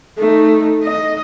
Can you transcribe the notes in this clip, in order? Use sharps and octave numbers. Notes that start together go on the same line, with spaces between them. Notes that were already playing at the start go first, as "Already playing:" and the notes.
A3 D#4
D#5